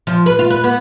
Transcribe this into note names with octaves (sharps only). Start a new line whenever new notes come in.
F3
B4
F4
B4
B3